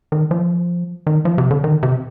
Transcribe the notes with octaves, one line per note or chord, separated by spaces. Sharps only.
D#3
F3
D#3
F3
C3
D3
D#3
C3